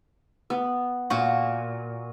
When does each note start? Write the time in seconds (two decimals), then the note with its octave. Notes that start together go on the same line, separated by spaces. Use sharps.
0.50 B3
1.10 A#2 F#4